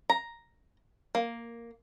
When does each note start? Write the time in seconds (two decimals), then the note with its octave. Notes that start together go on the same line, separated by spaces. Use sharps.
0.10 A#5
1.15 A#3